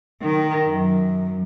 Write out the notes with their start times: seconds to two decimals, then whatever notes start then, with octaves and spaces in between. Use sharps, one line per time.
0.20 D#3
0.68 F#2